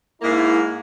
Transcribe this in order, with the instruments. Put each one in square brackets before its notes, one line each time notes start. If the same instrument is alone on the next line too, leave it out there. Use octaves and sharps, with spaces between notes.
[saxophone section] G#2 A#3 [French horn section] E4